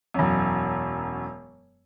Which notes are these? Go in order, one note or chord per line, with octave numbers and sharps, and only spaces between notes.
E1 F#2